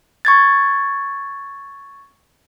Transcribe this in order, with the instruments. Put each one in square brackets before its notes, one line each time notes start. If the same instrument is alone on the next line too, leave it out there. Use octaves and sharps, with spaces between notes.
[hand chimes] C#6 G#6 A6